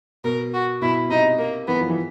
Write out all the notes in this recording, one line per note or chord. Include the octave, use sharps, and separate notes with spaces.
B2 A#4
F#4
B2 E4
C3 D#4
A#3
E3 B3
F3
E3